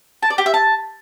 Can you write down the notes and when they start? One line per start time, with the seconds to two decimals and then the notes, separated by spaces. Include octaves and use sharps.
0.23 A5
0.30 D5
0.38 G4
0.46 E5
0.54 A5